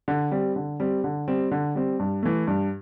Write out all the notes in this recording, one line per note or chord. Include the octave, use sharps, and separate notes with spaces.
D3
G3 C4
D3
G3 C4
D3
G3 C4
D3
G3 C4
G2
E3 A3
G2